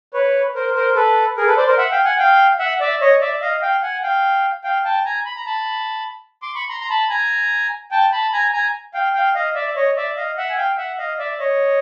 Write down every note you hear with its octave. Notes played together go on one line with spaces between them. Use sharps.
B4 C#5
A#4 C5
A#4 C5
A4 B4
G#4 A#4
A4 B4
C5 D5
A#4 C5
E5 F#5
F5 G5
F#5 G#5
F5 G5
E5 F#5
D5 E5
C#5 D#5
D5 E5
D#5 F5
F5 G5
F#5 G#5
F5 G5
F5 G5
G5 A5
G#5 A#5
B5
A#5
A5 B5
C6 D6
B5 C#6
A#5 C6
A#5
A5 B5
G#5 A#5
G5 A5
A5 B5
G#5 A#5
G#5 A#5
F5 G5
F5 G5
D#5 F5
D5 E5
C#5 D#5
D5 E5
D#5 F5
E5 F#5
G#5
F5 G5
E5 F#5
D#5 F5
D5 E5
C#5 D#5